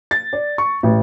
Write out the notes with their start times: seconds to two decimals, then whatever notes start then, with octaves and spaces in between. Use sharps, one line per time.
0.11 A6
0.33 D5
0.58 C#6
0.83 A1